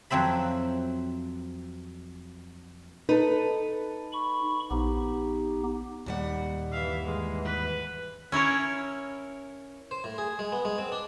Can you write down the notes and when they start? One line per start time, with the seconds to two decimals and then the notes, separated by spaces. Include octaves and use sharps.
0.10 F2 F#3 C4 E5 B5
3.09 D#4 A4 B4
4.13 B5 C#6
4.71 A#1 B3 D#4 G4
6.06 D#2 A#2 G3 F#5
6.72 G2 E3 E5 F5
7.04 G#2 E3 G#3
7.45 B4
8.32 C#4 E4 A#4 C#5
9.91 C5
10.04 A2
10.18 G#4
10.39 G#3
10.52 B3
10.65 G#3
10.78 C4
10.92 D4